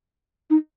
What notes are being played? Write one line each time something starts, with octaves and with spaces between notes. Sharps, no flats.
D#4